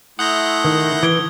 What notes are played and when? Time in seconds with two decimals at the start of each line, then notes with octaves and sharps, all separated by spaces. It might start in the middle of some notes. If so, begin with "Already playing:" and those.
0.19 A3 E4 F#5 C6 D#6 G6 A#6
0.64 D#3
1.03 E3 G#6 D7 G7